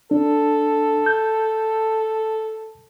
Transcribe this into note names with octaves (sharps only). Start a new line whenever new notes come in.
D4 A4
G6